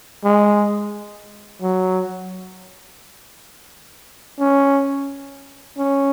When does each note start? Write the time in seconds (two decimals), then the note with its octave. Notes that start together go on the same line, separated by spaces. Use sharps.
0.24 G#3
1.62 F#3
4.39 C#4
5.77 C#4